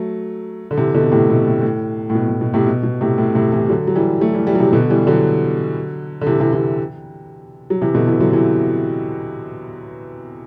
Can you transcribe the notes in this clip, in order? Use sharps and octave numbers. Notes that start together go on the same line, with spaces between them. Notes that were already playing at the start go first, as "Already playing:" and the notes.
Already playing: F#3 A3
D3
C3 E3
B2 D3
A2 C3
B2
A2
A2
A2
B2
A2
B2
A2 C3
B2
B2
A2 C3
A2
A2 C3
C3 E3
D3 F#3
F#3
E3 G3
F#3 A3
E3 G3
E3 G3
F#3
C3 E3
B2 D3
E3 G3
D3 F#3
D3
C3 E3
C3 E3
C3 E3
F#3
C3 E3
B2 D3
C3 E3
D3 F#3
C3 E3